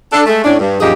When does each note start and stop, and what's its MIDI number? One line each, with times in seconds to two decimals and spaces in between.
0.12 0.22 62
0.12 0.22 69
0.26 0.43 56
0.26 0.43 57
0.45 0.57 45
0.45 0.57 61
0.45 0.57 62
0.60 0.78 43
0.80 0.93 42
0.80 0.93 46
0.80 0.93 53
0.80 0.93 63
0.80 0.93 67
0.80 0.93 68